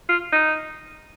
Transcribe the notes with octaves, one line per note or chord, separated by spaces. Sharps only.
F4
D#4